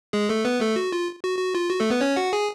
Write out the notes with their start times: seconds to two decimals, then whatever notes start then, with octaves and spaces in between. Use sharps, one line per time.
0.13 G#3 G#4
0.29 A3 A4
0.45 B3 B4
0.61 A3 A4
0.76 F#4
0.92 F4
1.23 F#4
1.39 F#4
1.55 F4
1.70 F#4
1.80 A3 A4
1.90 B3 B4
2.01 C#4 C#5
2.16 F#4 F#5
2.33 G#4 G#5